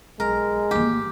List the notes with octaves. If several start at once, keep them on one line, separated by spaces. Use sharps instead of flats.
B1 G#3 A#4
G#1 E3 A#3 G4